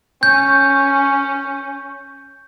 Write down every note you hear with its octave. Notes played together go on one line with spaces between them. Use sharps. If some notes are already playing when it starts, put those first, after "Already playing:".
C#4 G6